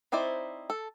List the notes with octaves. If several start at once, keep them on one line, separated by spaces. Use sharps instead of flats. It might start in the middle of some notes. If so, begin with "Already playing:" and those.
C4 D#4 E4 C5 D5
A4